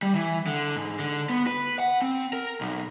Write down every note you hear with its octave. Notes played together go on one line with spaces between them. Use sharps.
G3
E3
D3
G#2
D3
B3
B4
F#5
C4
A#4
B1